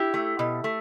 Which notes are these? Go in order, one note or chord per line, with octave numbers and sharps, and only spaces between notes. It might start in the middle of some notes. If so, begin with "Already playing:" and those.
Already playing: E4 G4
A3
B2
A3